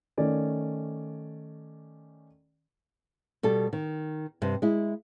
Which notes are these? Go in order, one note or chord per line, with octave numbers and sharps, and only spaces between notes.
D#3 A3 C#4 D5
B2 G3 A4
D#3
G2 C3
G#3 E4